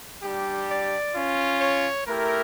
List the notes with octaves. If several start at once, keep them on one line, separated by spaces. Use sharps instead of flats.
G3 D4 G4
D5
C#4 F4
C#5
A3 E4 G4 A#4